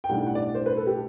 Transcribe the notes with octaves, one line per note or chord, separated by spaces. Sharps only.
G5
B1 A2 G3 D4 F#5
G5
F#5
D5
C5
B4
A4
G4